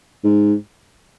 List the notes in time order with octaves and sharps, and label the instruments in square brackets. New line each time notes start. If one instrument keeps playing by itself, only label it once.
[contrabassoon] G#2